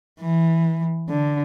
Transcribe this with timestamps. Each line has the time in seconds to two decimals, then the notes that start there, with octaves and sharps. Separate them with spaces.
0.20 E3
1.09 D3